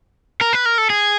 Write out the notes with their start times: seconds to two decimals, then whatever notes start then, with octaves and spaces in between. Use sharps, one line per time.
0.41 A#4
0.53 B4
0.66 A#4
0.78 A4
0.90 G#4